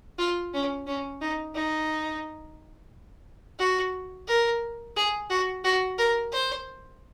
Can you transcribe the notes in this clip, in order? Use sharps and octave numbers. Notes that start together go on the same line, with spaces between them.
F4
C#4
C#4
D#4
D#4
F#4
A#4
G#4
F#4
F#4
A#4
C5